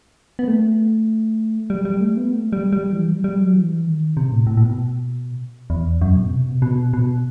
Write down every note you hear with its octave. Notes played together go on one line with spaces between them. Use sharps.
B3
A3
G3
G3
A3
B3
A3
G3
G3
E3
G3
G3
F#3
E3
D#3
C3
A2
A2
A2
B2
E2
F#2
B2
C3
B2
C3
B2
B2